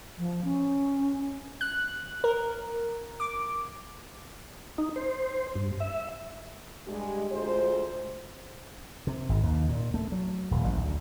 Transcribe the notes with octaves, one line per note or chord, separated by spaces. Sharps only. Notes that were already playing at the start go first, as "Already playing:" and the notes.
F3
C#4
F#6
A#4
D6
D#4
C5
G2
E5
G2 G#3 G4
D2 G#3 F4 C5
C3
G#1
D#2
A#2
A3
F#3
D#1
A1
D2